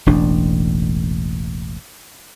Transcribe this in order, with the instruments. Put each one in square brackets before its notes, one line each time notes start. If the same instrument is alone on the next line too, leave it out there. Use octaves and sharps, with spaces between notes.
[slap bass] E1 A1 D4